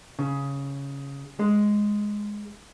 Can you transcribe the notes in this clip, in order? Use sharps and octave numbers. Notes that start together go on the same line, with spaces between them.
C#3
G#3